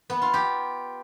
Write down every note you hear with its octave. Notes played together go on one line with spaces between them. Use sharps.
B3
F4
G4